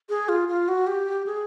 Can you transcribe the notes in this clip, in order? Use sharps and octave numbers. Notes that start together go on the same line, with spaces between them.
G#4
F4
F4
F#4
G4
G#4